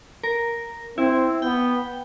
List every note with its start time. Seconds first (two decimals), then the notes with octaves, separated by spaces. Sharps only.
0.24 A#4
0.98 C4 E4
1.42 B3 G5